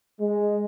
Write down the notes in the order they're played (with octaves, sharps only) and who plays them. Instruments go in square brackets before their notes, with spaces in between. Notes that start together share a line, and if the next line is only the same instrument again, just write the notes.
[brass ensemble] G#3